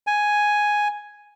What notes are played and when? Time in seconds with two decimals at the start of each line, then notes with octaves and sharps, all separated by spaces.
0.07 G#5